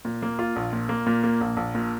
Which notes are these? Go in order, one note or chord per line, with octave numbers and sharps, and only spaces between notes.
A#2
A#3
F4
A#1
A#2
A#3
A#2
A#3
A#1
A#1
A#2